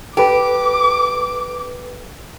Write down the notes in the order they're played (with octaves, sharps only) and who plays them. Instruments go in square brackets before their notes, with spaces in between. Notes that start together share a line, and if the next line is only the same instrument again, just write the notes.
[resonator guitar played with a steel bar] G4 [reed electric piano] A4 B4 [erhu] D6